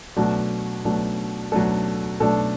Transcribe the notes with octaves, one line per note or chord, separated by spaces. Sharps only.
B2 F#3 A3 D4
B2 F#3 A3 D4
B2 F#3 A3 D4 A4
B2 F#3 A3 D4 A4